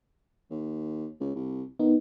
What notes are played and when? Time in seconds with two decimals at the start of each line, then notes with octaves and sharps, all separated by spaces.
0.51 D#2
1.20 C#2
1.35 C2
1.79 D#3 B3 D#4